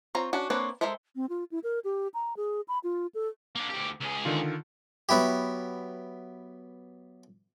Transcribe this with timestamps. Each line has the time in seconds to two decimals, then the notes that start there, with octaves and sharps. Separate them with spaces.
0.15 C4 F4 C#5 A#5
0.33 C#4 D4 F#4
0.50 A#3 C4 D4 B4 C#5
0.81 G#3 A4 A#4 C5 E5
1.16 C4
1.29 F4
1.52 E4
1.64 A#4
1.84 G4
2.14 A#5
2.37 G#4
2.68 B5
2.84 F4
3.15 A4
3.55 A#3 D4
3.70 D2 G4
4.00 C#2 G#4
4.25 D3 D#3 F4
5.09 F#3 B3 E4 G4